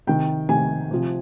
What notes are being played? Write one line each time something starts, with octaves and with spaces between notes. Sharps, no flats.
C3 D#3 G5
C3 D#3 G#5
C3 F3